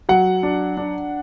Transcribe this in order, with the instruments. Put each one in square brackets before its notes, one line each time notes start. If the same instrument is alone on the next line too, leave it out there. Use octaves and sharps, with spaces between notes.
[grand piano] F#3 F#5
D4
D4